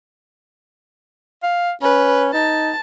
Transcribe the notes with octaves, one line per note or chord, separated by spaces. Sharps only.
F5
C#4 B4
D#4 A5